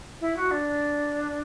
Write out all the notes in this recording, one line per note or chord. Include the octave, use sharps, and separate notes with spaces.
E4
F#4
D4